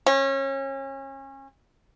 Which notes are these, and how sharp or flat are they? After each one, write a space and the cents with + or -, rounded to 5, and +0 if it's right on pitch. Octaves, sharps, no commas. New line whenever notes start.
C#4 -30